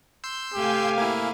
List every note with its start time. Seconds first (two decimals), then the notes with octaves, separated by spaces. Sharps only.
0.24 C6 E6 G6
0.54 C3 A3 G4 F5 G#5
0.98 A#3 E4